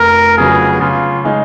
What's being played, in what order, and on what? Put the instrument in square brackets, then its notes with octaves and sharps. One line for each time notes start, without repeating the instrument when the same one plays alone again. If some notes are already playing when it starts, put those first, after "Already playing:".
Already playing: [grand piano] F1 [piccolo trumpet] A#4
[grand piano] F2 C#3 F#3 B3 [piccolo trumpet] G#4
[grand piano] C#3 [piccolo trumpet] F4
[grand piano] G#3 D#4 G#4